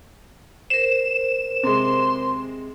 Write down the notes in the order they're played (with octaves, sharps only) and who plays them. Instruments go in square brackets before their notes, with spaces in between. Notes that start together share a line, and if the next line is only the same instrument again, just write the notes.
[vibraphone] A#4 C5 [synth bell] E7
[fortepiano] C3 G#3 [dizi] C6